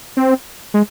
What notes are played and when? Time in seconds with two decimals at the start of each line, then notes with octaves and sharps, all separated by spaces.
0.17 C4
0.74 G#3